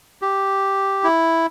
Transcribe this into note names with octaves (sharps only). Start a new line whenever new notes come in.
G4
E4